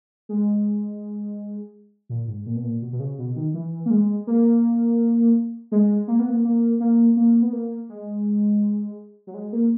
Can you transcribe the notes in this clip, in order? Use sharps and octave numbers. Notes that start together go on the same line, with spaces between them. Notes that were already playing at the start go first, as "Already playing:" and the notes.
G#3
A#2
G#2
A#2
B2
A#2
B2
B2
C#3
B2
D#3
E3
A#3
G#3
A#3
G#3
A#3
B3
A#3
A#3
A#3
A#3
B3
A#3
G#3
F#3
G#3
A#3